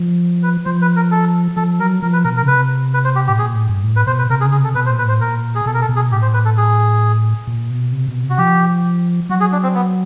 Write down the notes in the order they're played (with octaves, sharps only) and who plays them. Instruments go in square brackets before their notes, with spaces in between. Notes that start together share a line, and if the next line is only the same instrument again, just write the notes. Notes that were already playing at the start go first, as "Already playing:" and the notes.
Already playing: [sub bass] F3
[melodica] B4
[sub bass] F3 [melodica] C5
[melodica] B4
A#4
A4
[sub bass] F3 [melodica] A4
[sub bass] F#3 [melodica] A#4
[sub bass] F3 [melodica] A#4
[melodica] B4
[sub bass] B2 [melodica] A#4
[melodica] A#4
[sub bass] C#3
[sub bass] C3 [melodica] B4
[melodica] B4
C5
G4
[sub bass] A2 [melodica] G4
[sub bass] A#2 [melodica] G#4
[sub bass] A2
G2
A2
[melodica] B4
[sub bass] B2 [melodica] C5
[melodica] B4
[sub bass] C3 [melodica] A#4
[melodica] G#4
[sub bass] C#3
[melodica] G#4
[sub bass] C3 [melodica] A4
[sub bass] B2 [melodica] B4
[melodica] C5
[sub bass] A#2
[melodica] B4
[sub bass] A2 [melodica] C5
[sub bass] A#2 [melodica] A#4
[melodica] G#4
[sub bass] B2 [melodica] A4
[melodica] A#4
A4
[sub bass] B2
[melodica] G#4
[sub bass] A2 [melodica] G4
[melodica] C5
B4
A4
G#4
[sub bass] A#2
B2
C3
B2
C3
[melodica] F#4
[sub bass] F3 [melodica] G4
[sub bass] F#3 [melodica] F#4
[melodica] G#4
D4
C4
B3